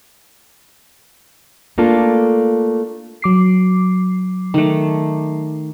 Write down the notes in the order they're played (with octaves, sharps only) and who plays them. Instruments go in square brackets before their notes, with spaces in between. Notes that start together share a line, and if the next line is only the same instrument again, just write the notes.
[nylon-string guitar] A3 A#3 D4 F4 A4
[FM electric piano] F#3 D6 C7
[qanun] D#3 A3